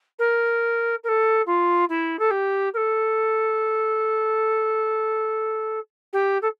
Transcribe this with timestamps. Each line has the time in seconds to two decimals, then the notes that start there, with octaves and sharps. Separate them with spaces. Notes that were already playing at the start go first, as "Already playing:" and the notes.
0.19 A#4
1.03 A#4
1.08 A4
1.46 F4
1.89 E4
2.19 A4
2.30 G4
2.73 A#4
2.77 A4
6.13 G4
6.42 A4